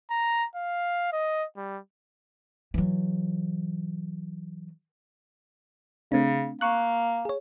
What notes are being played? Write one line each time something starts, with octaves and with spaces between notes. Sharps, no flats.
A#5
F5
D#5
G3
E3 F#3
C#3 A3 C4 D4
A#3 C#6 F#6
G#4 C#5